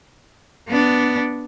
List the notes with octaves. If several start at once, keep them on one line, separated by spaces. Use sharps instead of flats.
B3 D4